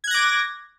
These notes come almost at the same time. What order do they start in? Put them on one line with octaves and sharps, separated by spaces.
G#6 F#6 A#6 D6